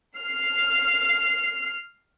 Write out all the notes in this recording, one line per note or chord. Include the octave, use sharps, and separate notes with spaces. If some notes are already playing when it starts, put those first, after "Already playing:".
F6 C7